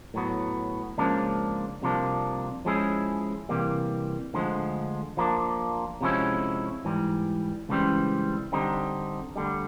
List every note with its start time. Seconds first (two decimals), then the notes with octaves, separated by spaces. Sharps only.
0.14 A2 F#3 B3
0.98 C#2 C#3 F3 A#3 D4
1.82 C2 C3 F3 A#3 D4
2.65 F3 G#3 C#4 E4 G#4
3.49 C3 E3 G3 A#3
4.34 D2 D3 F3 G#3
5.17 F3 A#3 D4
6.01 C3 F3 G#3 C#4 E4
6.85 G#2 E3 G3
7.69 C#2 C#3 E3 G3 C4
8.52 D3 G3 C4 D#4
9.36 D2 D3 G3